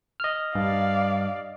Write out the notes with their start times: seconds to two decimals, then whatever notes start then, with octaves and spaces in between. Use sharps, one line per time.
0.20 D#5 F6
0.55 G2 D5 F5